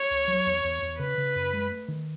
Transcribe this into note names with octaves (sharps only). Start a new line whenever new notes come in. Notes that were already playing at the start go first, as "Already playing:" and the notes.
Already playing: C#5
C#2
F#3
E2
E2
E2
C#3 B4
C#3
F#2
G#3
A3
D#3